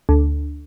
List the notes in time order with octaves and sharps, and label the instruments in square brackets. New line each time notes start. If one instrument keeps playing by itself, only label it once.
[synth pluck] D2